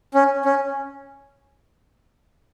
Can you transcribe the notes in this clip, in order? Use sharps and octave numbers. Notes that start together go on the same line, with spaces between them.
C#4
C#4